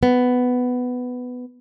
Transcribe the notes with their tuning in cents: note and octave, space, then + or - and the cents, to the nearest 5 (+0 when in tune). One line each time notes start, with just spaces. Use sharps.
B3 +10